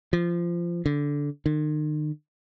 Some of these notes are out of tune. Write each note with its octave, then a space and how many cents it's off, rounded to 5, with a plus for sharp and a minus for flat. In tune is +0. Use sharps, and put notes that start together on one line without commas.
F3 -20
D3 -15
D#3 -40